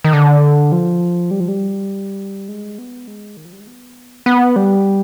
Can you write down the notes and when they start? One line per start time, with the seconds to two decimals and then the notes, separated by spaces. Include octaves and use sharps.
0.04 D#3
0.13 D3
0.72 F3
1.31 G3
1.40 F3
1.48 G3
2.48 G#3
2.78 B3
3.07 G#3
3.37 D#3
3.45 F3
3.52 G3
3.60 G#3
3.67 B3
4.26 B3
4.56 G3